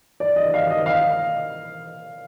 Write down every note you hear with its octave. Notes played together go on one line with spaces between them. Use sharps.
D5
D#5
F5
D#5
F5